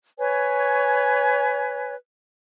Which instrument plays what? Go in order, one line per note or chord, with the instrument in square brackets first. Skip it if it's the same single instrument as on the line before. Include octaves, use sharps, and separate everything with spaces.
[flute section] B4 C#5 G#5